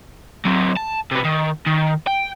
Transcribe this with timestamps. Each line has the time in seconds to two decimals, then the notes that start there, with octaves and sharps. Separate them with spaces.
0.45 F#3 C4
0.76 A5
1.11 C3 B3
1.24 D#3
1.67 D#3
2.07 G5